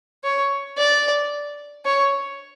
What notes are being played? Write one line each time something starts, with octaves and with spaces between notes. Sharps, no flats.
C#5
D5
C#5